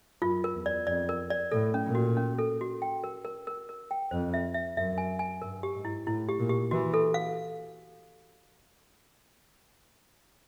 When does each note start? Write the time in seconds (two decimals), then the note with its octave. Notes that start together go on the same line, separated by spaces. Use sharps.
0.22 F#2 F4
0.44 A#4
0.55 E2
0.66 D5
0.87 F2 D5
1.09 A#4
1.30 D5
1.52 A2 A4
1.74 C#4
1.84 A#2
1.95 F#4
2.17 C#4
2.39 A4
2.61 F#4
2.82 G5
3.04 A#4
3.25 A#4
3.47 A#4
3.69 A#4
3.91 G5
4.11 F2 C5
4.34 E5
4.54 E5
4.77 F#2 E5
4.98 G#5
5.19 G#5
5.42 G2 A#4
5.63 G4
5.75 G#2
5.85 E4
6.07 A2 E4
6.29 G4
6.39 A#2
6.50 G4
6.71 E3 F#4
6.94 A4
7.14 F5